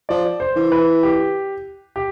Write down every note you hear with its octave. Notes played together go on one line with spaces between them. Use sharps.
F3 D5
C5
E3
B4
G4
G4